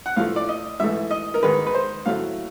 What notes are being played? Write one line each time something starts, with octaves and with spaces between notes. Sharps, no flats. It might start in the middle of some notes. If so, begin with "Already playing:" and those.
F#5
A2 F3 A3 F5
D5
D#5
G#2 E3 A3 E5
D#5
A#4
G#2 D#3 G#3 B4
B4
C5
A2 F#3 A3 F5